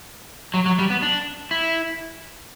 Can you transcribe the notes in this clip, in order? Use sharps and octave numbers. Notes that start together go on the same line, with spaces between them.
F#3
F#3
G3
B3
D4
E4